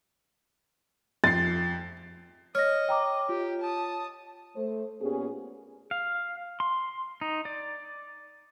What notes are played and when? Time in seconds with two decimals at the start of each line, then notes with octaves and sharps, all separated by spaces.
1.24 F2 A6 C7
2.55 C#5 D#5 F6 A#6
2.89 G5 A#5 D6
3.29 F4 G4
3.61 A5 D#6
4.56 A3 C5
5.01 A#2 B3 C#4 G4 G#4
5.91 F5
6.60 C6
7.21 D#4
7.45 D5